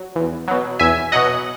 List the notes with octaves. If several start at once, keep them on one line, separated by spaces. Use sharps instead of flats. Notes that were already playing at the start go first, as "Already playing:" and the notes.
Already playing: F#3
E2
B2 F#3
E2 E5 G#5
B2 F#3 D#5 F#5